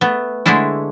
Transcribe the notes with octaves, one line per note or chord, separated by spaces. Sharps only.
A3 B3
D3 G#3 A3 D4 E4